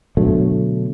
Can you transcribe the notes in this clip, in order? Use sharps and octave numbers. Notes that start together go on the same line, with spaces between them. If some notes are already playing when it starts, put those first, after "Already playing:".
B2 D3 F#3 A3